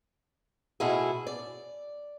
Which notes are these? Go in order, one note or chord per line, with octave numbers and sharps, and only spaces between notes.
B2 A3 E4 F4 G#4
D5